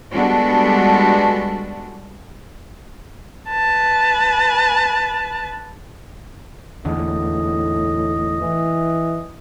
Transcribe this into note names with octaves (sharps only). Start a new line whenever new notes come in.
G3 G#3 B3 D4 F#4 A4
B4 A5
E2 A2 D3 D#5
E3